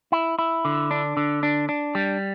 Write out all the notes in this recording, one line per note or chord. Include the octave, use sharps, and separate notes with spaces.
E4
E4
D3
D4
D3
D4
D4
G3